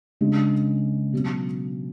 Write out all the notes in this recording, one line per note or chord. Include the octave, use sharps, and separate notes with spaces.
C#3 G#3 D4
B2 F#3 C#4